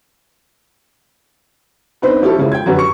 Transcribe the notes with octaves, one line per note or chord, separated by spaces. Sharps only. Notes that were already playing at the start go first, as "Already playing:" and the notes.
B3 C4 D4 D#4 B4 C5
F3 C#4 E4 G4 A4
G#2 C#3 F3 E4
G5 G#6
F#2 D3 C#4 F#4 G4 B4
C#6 C#7